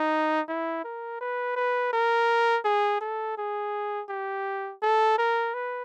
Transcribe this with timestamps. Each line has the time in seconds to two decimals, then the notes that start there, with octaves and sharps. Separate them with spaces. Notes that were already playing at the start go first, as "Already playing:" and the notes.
Already playing: D#4
0.48 E4
0.85 A#4
1.21 B4
1.56 B4
1.93 A#4
2.65 G#4
3.01 A4
3.38 G#4
4.09 G4
4.82 A4
5.18 A#4
5.54 B4